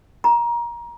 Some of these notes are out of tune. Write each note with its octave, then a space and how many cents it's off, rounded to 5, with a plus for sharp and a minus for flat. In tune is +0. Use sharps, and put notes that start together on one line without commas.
A#5 +25